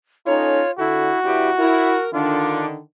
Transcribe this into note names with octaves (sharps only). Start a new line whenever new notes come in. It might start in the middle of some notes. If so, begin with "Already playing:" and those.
C#4 D#4 F4 A4 C#5
D3 E4 F#4 A4
G2 E4 G4
E4 A#4
D3 D#3 D4 F4